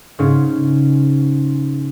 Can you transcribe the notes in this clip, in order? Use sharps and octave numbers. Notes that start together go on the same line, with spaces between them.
G#2 C#3 C#4